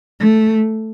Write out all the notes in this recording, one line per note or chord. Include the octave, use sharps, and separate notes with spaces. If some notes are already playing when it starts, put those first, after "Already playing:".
A3